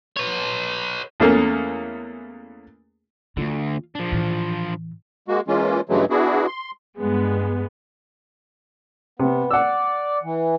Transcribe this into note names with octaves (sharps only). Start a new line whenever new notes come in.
B4 C#5
E2 A3 A#3 C#4
D2 D3 F4
F3 D4
A2 E3
G#3 A#3 F#4
E3 G#3 A#3 C#4 F4
G2 C#3 E3 F#3 G#3 A3
B3 D4 E4 F#4 G#4
C6
G2 G#3 B3
C3 B3
D5 F#5 E6
E3